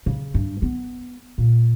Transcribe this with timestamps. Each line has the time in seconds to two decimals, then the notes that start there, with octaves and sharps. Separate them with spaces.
0.06 C#3
0.34 G2
0.62 B3
1.38 A#2